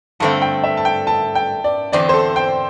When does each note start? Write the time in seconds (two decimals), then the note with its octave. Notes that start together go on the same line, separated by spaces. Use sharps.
0.20 G2 D3 A3 C4 A5
0.42 G5
0.64 E5
0.77 A5
0.85 G5
1.07 A5
1.35 G5
1.64 D5
1.92 E2 D3 C4 D5
2.09 C5
2.14 A4
2.36 G5